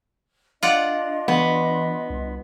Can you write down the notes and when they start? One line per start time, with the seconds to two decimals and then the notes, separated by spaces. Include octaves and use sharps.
0.63 D4 F4 D5 D#5 F#5 C6
1.28 E3 B3
2.10 C2